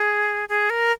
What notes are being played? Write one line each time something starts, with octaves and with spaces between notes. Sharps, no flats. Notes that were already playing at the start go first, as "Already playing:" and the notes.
Already playing: G#4
G#4
A#4